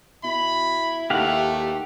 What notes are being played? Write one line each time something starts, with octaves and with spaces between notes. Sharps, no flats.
B2 E4 B5
D#2 A3 G4 F5 F#5